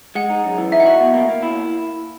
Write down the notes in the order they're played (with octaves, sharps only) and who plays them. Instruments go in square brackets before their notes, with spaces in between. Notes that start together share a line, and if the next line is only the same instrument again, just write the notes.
[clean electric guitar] G#3 [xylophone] F#5
[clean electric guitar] D#4
F#2
E3
[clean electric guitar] D#4 [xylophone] E5
[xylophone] F#5
[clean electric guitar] F#4 [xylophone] E5
[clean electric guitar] B2
A#3
A#3
E4